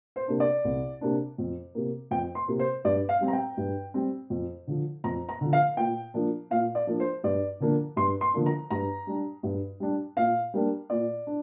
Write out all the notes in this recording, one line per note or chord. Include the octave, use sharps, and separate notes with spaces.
C5
C3 A#3 D4
D5
C2
C3 A#3 D4
F2
C3 A#3
F2 G5
C6
C3 A#3
C5
G2 D5
F5
G3 C4
A#5
G5
G2
G3 C4
F2
D3 F3
F2 A#5
A#5
D3 F3
F5
A#2 G5
F3 A#3 D4
A#2 F5
D5
F3 A#3 D4
C5
G2 D5
D3 F3 A#3 D4
G2 C6
C6
D3 F3 A#3 D4
A#5
G2 A#5
G3 D4
G2
G3 D4
A#2 F5
G3 A#3 D4
A#2 D5
D4